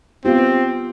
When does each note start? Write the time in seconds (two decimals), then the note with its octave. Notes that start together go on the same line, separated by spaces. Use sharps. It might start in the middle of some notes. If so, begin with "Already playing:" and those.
0.25 B3 C4 F4 G4